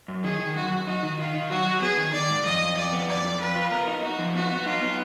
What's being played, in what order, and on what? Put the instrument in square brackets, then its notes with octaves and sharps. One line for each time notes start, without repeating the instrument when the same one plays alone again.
[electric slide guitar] F#2
[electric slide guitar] D#3 [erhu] G#4
[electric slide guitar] D#3
[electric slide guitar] F#2 [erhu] F#4
[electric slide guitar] F#2
[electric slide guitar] D#4 [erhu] F#4
[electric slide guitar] D#3
[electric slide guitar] D#3 [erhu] F4
[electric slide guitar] D#3
[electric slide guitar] F#3 [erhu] F#4
[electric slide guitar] F#3
[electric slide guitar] B3 [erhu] G#4
[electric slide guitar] D#3
[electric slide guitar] D#3 [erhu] D5
[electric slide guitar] G#2
[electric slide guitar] F2 [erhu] D#5
[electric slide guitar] F2
[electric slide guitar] F2 [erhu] D5
[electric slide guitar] B3
[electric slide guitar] F2 [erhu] D5
[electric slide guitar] F2
[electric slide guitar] F2 [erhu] B4
[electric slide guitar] F4
[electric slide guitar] B3 [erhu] A#4
[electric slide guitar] D#4
[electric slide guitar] D#4 [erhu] F#4
[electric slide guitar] F3
[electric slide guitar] B3 [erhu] F#4
[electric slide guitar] B3
[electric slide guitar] D#4 [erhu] F4
[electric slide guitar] B3